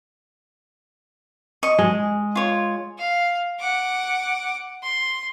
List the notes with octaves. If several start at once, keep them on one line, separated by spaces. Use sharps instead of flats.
D#5 C#6
G#3
F4 C#5
F5
F#5 D6
C6